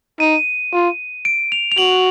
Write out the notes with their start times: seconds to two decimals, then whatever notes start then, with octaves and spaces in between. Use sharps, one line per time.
0.20 D#4 D#7
0.73 F4
1.25 D7
1.52 F7
1.72 F7
1.78 F#4 F#7